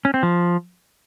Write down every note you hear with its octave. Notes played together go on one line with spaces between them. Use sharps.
C#4
C4
F3